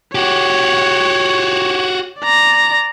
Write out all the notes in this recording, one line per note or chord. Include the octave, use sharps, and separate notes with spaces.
F#4 G4 C#5
D5 A#5